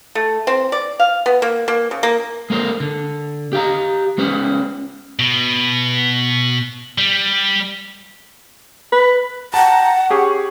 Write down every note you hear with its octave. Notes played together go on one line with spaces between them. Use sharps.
A3
C4
D5
F5
B3
A#3
A#3
C#3
A#3
G#3 A#3 A#4 C5
D3
G4 F5 A#5
G#3 C#4 B4 C5
B2
G3
B4
F#5 G5 A5 A#5
C#4 G4 G#4 C#6